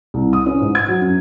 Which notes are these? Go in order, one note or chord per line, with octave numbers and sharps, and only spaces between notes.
C2
D#6
C#4
G#2
G#6
F#3
F#2